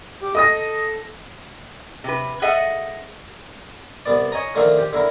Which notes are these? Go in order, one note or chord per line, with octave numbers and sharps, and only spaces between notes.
G4
A4 D#5 D#6 A#6
C3 B4
G#4 A4 D#5 E5 F#5
C2 B3 D5
C#5 D#5 G#5 A#5
D3 D#3 F3 A3 A#3
G4
D3 E4 A#4